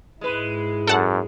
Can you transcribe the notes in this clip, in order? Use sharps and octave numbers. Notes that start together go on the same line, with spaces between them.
G#2 G#3 E4 B4
F#2 A4 F#5 A5